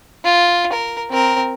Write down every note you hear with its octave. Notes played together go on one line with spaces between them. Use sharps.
F4
A#4
C4 A#4